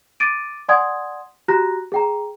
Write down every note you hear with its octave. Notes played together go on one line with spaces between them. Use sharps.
D6 A6 D7 D#7
D5 F#5 G#5 C6 D#6 G#6
F#4 G4 A#5 F#6 A#6
G#4 G5 A#5